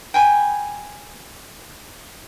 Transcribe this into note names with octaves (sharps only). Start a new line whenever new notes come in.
G5 G#5 B5